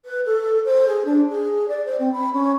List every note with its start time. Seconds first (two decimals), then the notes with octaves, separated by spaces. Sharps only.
0.05 B4
0.25 A4
0.64 C5
0.87 G#4
1.05 D4
1.29 G#4
1.68 D5
1.85 C5
1.99 C4
2.12 B5
2.33 C#4